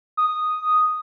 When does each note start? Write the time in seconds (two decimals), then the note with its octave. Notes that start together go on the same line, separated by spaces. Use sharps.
0.17 D#6